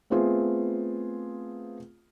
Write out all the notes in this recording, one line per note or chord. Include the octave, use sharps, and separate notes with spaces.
A3 B3 C4 F4 G#4